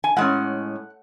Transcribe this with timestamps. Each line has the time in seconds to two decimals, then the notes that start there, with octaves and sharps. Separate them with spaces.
0.04 G#5
0.17 A2 G#3 C#4 F#5